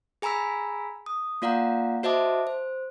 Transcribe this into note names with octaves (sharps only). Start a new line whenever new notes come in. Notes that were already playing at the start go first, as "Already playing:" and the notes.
G#4 G#5 A#5 B5 E6 B6
D#6
A#3 F4 D5 F5 F#5 A#5
F#4 C5 D#5 E5 A5 D6
C5